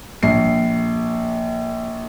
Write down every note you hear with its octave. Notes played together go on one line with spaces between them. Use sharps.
A#1 C7